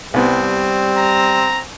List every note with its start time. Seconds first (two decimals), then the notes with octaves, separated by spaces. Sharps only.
0.14 C2 G3 B3 C4
0.98 A#5